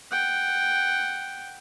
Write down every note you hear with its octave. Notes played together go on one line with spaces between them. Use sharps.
F#5 G5